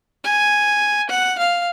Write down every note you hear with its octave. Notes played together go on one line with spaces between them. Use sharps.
G#5
F#5
F5